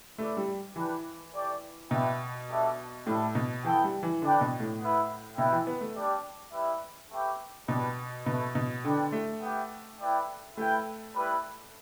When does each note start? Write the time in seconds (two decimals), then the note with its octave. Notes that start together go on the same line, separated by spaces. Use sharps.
0.18 A3 E4 B4 D5
0.37 G3
0.75 E3 D4 G4 B4
1.33 A3 G4 D5
1.91 B2 B3 D4 B4 E5 G5
2.49 G3 D4 A4 E5
3.07 A2 G3 E4 A4
3.35 B2
3.64 E3 B3 E4 A4 G5
3.84 G3
4.03 E3
4.22 D3 D4 B4 D5 G5
4.41 B2
4.60 A2
4.80 B3 E4 B4
5.37 B2 E4 B4 E5 G5
5.52 E3
5.67 B3
5.81 A3
5.95 G3 D4 G4 D5
6.53 G3 E4 B4 E5
7.11 A3 G4 B4 E5 G5
7.68 B2 G3 D4 B4
8.26 B2 A3 E4 B4
8.55 B2
8.84 D3 D4 B4 D5 G5
9.12 A3
9.41 B3 G4 E5 G5
10.00 E4 B4 D5 G5
10.57 A3 E4 B4 G5
11.15 G3 E4 B4